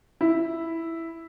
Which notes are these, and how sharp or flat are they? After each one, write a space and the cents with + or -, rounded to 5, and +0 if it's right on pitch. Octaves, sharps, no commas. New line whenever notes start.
E4 +0